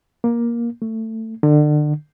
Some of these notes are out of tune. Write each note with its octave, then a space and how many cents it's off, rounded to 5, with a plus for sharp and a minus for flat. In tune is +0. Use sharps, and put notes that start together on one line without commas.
A#3 +15
A3 +20
D3 +30